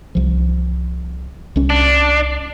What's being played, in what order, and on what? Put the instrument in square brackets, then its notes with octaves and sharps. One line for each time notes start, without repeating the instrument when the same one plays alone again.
[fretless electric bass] C2 F3
C2 C#4
[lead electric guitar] D4